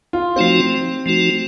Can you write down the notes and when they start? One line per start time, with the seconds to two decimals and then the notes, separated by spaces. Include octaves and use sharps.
0.13 F4
0.36 F3 A3 C4 D#4 F#4
1.06 F3 A3 D#4 F#4